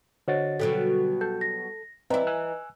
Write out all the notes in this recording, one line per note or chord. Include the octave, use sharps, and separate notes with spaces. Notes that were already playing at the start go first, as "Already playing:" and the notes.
D3 F#4 C5 C#5 D#5 A6
B2 F#3 G3 A4
A4 G6
A#6
E3 C4 E4 B4 D5 D#5 A#5
G#5 E6 F#6